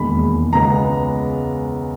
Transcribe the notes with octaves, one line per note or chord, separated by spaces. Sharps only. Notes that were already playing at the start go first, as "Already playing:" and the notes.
Already playing: E1 D#2 D#3 G#3 B5
C#2 C#3 G#3 B3 A#5